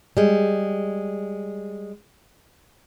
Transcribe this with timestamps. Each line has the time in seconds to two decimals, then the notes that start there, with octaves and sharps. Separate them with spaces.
0.17 G3 G#3